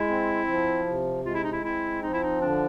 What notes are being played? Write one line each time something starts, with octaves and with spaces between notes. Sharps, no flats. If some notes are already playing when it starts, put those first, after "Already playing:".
Already playing: G#3 E4
C4
F3
C3
G#3 F4
E4
D#4
E4
C4 E4
F3 D#4
E4
D#4
D3 D4